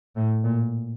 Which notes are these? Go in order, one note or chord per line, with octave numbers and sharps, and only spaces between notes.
A2
A#2